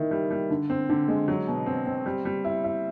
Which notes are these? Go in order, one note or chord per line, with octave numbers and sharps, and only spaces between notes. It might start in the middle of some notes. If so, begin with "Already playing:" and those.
Already playing: D#3 E4
G3
G3
D3
C4
D3
G#3
F#3
B2
C4
C4
G3
G3
E4
E4